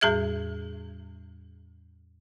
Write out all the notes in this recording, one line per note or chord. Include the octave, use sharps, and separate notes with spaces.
E2 A2 G3 G#4 E5 G#6